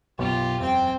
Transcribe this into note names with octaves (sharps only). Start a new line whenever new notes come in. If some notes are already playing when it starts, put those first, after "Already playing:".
B1 F#2 B2 F4 G4
E1 F#2 C4 G5